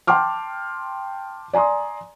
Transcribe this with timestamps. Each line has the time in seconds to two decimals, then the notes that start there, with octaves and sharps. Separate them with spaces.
0.07 G5 A5 C6 D6 F6
1.53 D5 G#5 A#5 C6 D#6